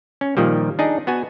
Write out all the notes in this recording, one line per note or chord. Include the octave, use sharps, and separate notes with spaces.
C#4
A#2 D#3 F3 G3
D4 D#4 G#4
B3 F#4 G#5